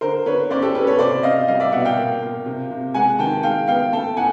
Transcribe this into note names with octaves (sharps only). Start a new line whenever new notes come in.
D3 A#4 C5
D3 B4 C#5
C#4 C5 D5
G4 A4
C#4 A4 B4
B4 C#5
C3 C5 D5
C3 D#5 F5
G3 D#5 F5
D5 E5
B2 E5 F#5
F5 G5
A#2
A#2
C3
C3
G#3 F#5 G#5
D#3 G5 A5
G#3 F5 G5
B3 F5 G5
A3 G5 A5
A2 F#5 G#5